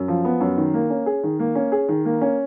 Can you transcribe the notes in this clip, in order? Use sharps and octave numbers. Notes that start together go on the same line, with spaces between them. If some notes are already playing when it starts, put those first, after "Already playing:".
Already playing: F#2
F3
B3
F#2
D#3
A#3
C#4
G#4
D#3
A#3
C#4
G#4
D#3
A#3
C#4